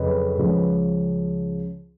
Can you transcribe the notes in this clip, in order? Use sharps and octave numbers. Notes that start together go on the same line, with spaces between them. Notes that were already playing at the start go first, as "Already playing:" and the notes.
Already playing: F2 C#3 F#3 B4 D#5
C#2 C#3 F3